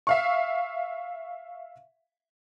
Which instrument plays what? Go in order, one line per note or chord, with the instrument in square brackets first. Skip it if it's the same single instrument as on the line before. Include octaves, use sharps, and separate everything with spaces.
[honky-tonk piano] E5 F5 C#6